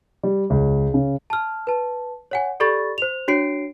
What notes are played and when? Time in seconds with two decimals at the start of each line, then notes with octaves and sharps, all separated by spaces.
0.23 G3
0.50 C#2
0.94 C#3
1.30 A5 F6
1.67 B4 A5
2.31 C#5 F#5 G#5
2.60 G4 A4 D5 B5 C#6 A6
2.98 C5 F7
3.28 D4 F#4 C#5 C7 D7